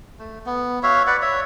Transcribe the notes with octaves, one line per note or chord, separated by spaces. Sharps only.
A3
B3
F#4 C#5 E5 F5
B4 D5 F#5
C#5 E5